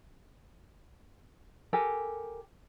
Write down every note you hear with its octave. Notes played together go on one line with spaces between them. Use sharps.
G4 A4 A#4 G#5